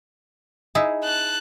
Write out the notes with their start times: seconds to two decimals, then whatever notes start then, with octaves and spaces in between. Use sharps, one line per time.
0.75 D#4 E4 G#4
1.04 A5 F#6